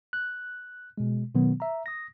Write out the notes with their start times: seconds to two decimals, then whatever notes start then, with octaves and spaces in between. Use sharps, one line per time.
0.13 F#6
0.98 B2 G#3
1.35 B2 D#3 F#3 B3
1.60 E5 A#5
1.86 D#6 A#6